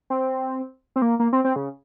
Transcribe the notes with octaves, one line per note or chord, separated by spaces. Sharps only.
C4
C4
A#3
A#3
C4
C4
C#3